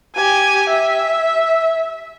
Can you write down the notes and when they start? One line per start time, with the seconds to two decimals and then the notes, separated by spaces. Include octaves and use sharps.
0.15 G4 G#5
0.69 E5